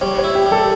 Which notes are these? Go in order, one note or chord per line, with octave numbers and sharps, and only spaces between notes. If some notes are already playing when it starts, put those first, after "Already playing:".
G3 C#5
C#5
E4
G4
G3
A4